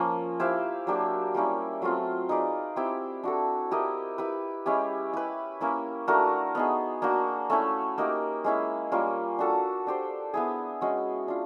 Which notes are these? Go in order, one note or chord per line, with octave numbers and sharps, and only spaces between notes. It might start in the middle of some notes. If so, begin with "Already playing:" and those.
Already playing: F3 A#3 C#4
E4 G4 C5 F5
F#3 A#3 D4 G4
G3 A#3 C#4 E4
F#3 A3 C4 F4
D#4 G#4 B4 D5
C4 E4 G4
D4 F#4 A4
E4 G4 A#4 D#5
E4 G4 B4
G#3 C#4 E4 G4
E4 G4 B4
A#3 C#4 E4
A3 D4 F#4 A#4
B3 D#4 G#4
A#3 D4 F#4
A3 C#4 E4
A#3 D#4 G4
G#3 C#4 E4
G3 A#3 C#4 F4
D4 F#4 A4
D4 G4 C5
B3 E4 G#4
G#3 C#4 F#4
D4 F4